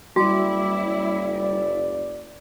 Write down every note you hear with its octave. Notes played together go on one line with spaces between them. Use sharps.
F#1 G3 E4 F#4 D5 D6